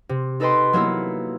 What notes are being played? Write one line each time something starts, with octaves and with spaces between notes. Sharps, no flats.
C3
D#4 A4 B4 D#5 G5 C6
F#3 A#3 B3 E4